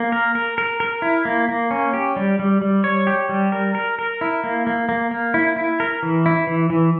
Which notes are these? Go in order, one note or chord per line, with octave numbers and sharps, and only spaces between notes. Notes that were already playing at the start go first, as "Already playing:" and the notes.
Already playing: A#3
A#4
A#4
A#4
A#4
E4
A#3
A#3
C#4
G4
G3
G3
G3
C#5
G4
G3
A#4
A#4
A#4
E4
A#3
A#3
A#3
A#3
E4
E4
A#4
E3
E4
E3
E3